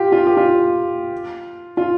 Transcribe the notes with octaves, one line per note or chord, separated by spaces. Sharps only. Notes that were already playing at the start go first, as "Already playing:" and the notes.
Already playing: F4 G4
F4
G4
F4
F4